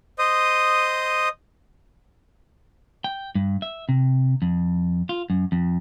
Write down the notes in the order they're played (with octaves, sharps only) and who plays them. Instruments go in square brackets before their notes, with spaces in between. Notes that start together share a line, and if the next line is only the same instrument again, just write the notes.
[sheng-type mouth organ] C5 D#5 D#6
[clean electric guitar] G5
G2
E5
C3
F2
F4
F#2
F2